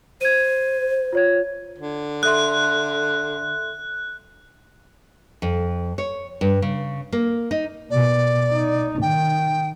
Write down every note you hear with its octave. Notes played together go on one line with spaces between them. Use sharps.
C5 G#6 D#7
F4 C#5 G#6
D3
A4 E5 C6 F#6
F2
C#5
G2
C#3
A#3
D#4
B2 D5
D#4
D#3 G5